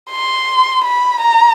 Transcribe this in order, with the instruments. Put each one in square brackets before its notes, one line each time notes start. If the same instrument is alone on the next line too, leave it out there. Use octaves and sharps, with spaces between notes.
[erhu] C6
B5
A#5